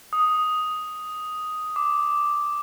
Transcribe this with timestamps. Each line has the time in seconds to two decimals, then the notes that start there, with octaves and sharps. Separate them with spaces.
0.13 D#6
1.76 D6